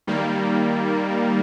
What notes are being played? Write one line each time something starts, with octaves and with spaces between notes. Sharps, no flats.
D#3 G3 A#3